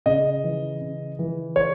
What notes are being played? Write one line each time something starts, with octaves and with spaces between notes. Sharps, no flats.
C#3 D#5
E3
C#3
E3
C#5